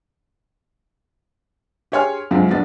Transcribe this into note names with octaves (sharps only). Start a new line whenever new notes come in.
G4 G#4 C#5 G#5 C6 F6
C#2 F#2 C3 F3 F#3
A#1 F#3 B3 D4 A6